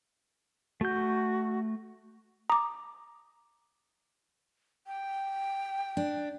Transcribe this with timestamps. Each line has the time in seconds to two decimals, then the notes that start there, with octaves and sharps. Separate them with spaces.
0.81 A3 F#4 G6
2.50 A#5 D6 D#6
4.87 G5
5.97 D4